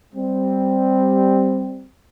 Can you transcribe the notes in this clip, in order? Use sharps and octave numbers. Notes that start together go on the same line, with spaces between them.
G3 C4